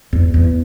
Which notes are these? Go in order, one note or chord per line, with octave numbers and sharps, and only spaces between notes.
E2
E2